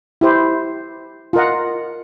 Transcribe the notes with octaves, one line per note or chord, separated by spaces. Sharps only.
E4 G4 C5
F4 A#4 D#5 F#5